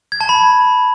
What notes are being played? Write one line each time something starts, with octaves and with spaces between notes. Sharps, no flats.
G#6
A5
B5